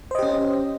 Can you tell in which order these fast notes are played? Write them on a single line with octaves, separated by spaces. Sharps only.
C5 D#5 G4 C#4